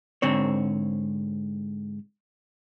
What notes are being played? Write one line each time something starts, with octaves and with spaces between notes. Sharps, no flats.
G#2 D3 C4 C#5